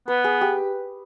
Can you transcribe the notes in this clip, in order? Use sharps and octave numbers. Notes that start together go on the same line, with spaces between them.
B3 B4
G#4
G4